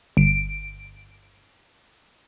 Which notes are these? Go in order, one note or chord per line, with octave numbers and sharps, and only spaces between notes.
G1 D7